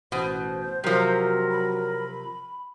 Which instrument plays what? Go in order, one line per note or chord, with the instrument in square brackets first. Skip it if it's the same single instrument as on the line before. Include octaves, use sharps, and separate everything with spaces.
[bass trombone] A1 [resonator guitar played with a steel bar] B2 [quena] C5
[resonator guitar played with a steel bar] C3 F3 [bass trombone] F#3 [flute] A#4
[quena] B5